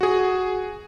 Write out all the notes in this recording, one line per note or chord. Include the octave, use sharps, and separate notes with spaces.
F#4 G#4